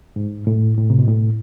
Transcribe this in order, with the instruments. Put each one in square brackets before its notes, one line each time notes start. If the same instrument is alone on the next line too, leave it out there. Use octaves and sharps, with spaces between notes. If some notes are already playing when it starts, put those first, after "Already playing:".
[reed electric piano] G#2
A2
A2
C3
B2
A2